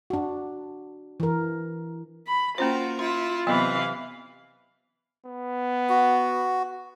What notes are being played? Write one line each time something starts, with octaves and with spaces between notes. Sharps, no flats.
D4 F#4
E3 A#4
B5
A#3 C#4 F4 F#4 A#4 C5
E4 F4 C6
C3 E3 F#3 B3 D#5 F5 B5
B3
F#4